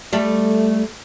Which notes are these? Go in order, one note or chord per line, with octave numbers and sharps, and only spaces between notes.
G3 A3